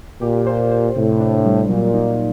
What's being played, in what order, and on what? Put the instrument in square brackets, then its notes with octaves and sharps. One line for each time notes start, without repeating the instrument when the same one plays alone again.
[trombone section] A#2 [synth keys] G4
[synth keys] C5
C5
[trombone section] A2 [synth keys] C3
[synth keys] D4
G3
[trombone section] A#2 [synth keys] F#3
[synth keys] D#4